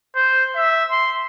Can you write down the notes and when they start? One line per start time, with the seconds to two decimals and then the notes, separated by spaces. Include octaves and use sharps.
0.15 C5
0.55 E5
0.91 C6